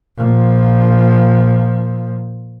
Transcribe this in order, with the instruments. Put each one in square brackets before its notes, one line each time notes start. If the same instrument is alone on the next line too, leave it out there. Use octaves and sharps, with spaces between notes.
[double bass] A#2 F3